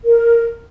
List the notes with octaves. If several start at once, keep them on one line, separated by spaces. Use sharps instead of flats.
A#4